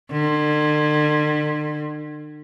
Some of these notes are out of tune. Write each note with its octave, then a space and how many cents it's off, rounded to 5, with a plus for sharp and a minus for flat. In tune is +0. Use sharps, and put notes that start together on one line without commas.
D3 +45